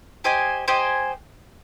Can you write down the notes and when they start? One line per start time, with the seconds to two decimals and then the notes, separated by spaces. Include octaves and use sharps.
0.24 G4 C5 D#5 G#5
0.68 G4 C5 D#5 G#5